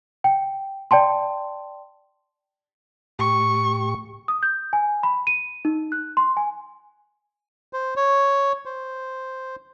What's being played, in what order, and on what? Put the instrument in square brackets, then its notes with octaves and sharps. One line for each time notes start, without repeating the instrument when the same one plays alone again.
[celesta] G5
D5 G5 A5 C6
[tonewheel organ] A2 G4 [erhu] C#6
[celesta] D#6
G6
G#5
B5
D#7
D#4
F#6
C6
G#5
[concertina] C5
C#5
C5